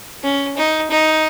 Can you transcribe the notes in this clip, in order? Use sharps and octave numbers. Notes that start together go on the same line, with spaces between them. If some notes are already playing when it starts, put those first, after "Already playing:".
C#4
D#4
D#4